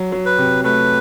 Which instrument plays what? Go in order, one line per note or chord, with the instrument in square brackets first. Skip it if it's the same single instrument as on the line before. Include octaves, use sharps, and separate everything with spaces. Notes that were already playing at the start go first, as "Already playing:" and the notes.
Already playing: [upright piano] F#3
F#3
[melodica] B4
[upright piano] C3
[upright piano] A3 [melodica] B4